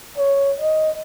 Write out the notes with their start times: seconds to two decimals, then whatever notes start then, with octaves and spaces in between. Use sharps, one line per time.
0.17 C#5
0.60 D#5